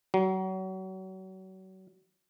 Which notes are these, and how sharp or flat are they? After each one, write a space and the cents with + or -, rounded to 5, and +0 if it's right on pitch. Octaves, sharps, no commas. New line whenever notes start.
F#3 +30